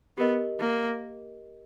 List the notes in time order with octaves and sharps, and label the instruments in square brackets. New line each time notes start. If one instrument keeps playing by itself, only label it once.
[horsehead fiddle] B3 [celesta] G4 A#4 D#5
[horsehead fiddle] A#3